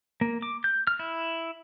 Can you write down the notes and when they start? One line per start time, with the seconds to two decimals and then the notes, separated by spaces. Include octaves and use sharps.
0.21 A#3
0.42 D6
0.64 G6
0.87 F6
0.99 E4